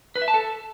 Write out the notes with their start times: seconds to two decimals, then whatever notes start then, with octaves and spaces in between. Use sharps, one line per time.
0.16 B4
0.22 E5
0.28 A5
0.34 A4